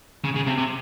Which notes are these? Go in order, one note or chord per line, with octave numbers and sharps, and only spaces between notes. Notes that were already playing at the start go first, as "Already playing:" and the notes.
C#3
C#3
C3
C3